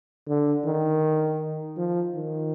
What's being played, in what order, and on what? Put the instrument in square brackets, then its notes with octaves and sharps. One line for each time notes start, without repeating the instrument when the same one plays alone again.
[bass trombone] D3
D#3
F3
D#3